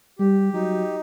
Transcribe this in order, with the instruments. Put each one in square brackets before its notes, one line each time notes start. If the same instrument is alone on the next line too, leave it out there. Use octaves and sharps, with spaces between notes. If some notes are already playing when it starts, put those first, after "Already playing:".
[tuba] G3 [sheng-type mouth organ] G4
[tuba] F#3 [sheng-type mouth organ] D#4